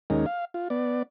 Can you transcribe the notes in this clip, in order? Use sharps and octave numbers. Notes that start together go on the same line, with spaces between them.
D#2 G#3 C#4 D#4 A#4
F5
F4
B3 D5